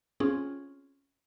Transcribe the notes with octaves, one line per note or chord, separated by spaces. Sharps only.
C4 C#4 F4 G#4